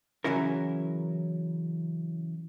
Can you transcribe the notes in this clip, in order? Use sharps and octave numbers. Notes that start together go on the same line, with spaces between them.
C#3 E3 F#3 C#4 E4 A#4